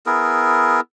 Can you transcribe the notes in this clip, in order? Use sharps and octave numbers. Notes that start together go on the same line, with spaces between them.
B3 E4 G#4 A#4